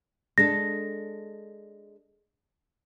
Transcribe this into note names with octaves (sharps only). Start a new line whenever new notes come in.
G#3 D4 A4 A#6